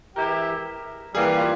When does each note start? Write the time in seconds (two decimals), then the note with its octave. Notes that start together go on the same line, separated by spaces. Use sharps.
0.16 E3 G#3 E4 G4 A#4
1.15 E3 G3 A#3 G#4
1.38 F4